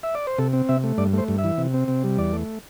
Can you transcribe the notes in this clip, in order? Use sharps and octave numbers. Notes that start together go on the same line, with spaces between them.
E5
D5
C5
C3 A4
C4
C3 E5
A3
G2 D5
A3 C5
G2
E5
E3
C3
C4
C3
G3
E2 D5
A3